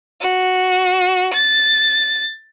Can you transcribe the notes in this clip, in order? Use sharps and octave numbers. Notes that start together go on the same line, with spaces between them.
F#4
A6